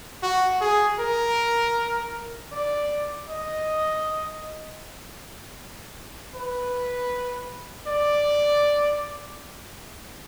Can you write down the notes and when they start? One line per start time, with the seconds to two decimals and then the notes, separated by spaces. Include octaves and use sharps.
0.22 F#4
0.61 G#4
0.99 A#4
2.52 D5
3.29 D#5
6.35 B4
7.87 D5